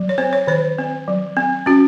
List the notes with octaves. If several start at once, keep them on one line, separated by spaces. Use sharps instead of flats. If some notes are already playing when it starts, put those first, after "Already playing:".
Already playing: F#3
C#5
C4 C5
C#5
D#3 C5
C4
F#3
C4
C#4 F#4